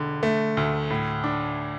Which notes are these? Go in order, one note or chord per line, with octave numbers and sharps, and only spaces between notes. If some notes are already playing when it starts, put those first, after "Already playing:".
Already playing: E1 D3
A3
D2
A2
D4